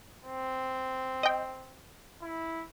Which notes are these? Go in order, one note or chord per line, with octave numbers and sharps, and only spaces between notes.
C4
D#5 G5
E4